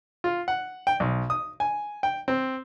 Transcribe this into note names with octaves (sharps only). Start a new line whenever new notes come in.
F4
F#5
G5
B1
D#6
G#5
G5
C4